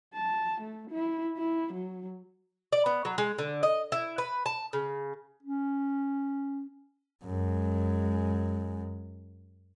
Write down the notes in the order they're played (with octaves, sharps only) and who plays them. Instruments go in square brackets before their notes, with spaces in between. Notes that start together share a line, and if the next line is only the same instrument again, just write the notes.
[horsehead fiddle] A5
A3
E4
E4
F#3
[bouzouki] D5
B3
F#3
G#3
D3
D#5
E4
B4
A5
C#3
[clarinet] C#4
[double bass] F#2 G#3